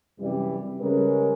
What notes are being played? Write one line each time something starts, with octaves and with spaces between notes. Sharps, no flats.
F#2 C3 E3 G3
C#3 G3 G#3 C#4 A#4 B4